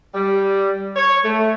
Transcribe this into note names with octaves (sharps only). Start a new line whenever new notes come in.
G3
C#5
A3